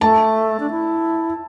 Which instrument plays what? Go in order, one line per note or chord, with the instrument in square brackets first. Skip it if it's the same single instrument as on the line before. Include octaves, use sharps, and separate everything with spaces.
[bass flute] A3 [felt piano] A5
[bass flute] D4
E4